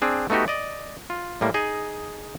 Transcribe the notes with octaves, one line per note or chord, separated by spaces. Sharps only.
C4 D4 G#4
A3 B3 D#4 F#4 G4
D5 D#5
F4
A2 G3 A#3
D#4 G#4 D#5